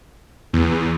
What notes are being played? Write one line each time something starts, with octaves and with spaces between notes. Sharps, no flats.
E2